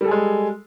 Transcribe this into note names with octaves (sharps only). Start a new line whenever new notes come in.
G3 G#3 G#4 A4